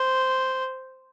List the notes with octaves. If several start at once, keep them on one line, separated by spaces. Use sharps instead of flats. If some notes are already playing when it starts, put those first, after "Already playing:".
Already playing: C5